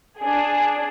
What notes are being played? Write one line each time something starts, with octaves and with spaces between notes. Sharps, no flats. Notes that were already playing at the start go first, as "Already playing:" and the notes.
D4 G#4